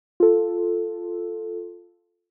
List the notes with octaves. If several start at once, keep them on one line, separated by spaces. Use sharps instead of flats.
F4 A4